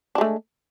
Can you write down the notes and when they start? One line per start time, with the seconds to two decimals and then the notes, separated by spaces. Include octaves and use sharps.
0.15 D4
0.18 G#3
0.21 A3